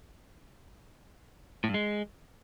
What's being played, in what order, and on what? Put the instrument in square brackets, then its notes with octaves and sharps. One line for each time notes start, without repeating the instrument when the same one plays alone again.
[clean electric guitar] A2
G2
G#3